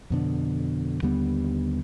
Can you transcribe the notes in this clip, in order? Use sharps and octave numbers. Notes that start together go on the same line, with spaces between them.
F2 B2 D3
D#2 D3 G3 B3